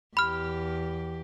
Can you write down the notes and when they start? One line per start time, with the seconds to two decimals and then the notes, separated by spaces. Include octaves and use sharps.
0.17 E2 G4 B5 F6